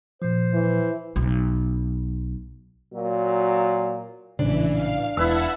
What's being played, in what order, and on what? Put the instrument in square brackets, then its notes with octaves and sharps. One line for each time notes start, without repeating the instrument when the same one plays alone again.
[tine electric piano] A#2 F3 [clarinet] C5
[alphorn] E3
[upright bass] B1
[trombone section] A#2 F#3
[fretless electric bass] A#1 A2 C#3 [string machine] E3 [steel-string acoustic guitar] D4
[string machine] F5
[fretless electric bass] E1 [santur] E4 B4 E6 [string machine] E5 F#5 A5